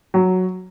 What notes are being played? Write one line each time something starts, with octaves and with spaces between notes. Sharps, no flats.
F#3